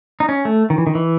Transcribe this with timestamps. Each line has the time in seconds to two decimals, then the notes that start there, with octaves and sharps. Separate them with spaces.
0.20 D#4
0.29 C#4
0.45 A3
0.70 D#3
0.78 E3
0.87 D#3
0.95 E3